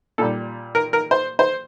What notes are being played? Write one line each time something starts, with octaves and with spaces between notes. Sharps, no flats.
A#2 G3 A4
A#4
A#4
C5
C5